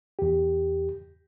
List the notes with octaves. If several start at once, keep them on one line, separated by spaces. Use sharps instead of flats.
E2 G4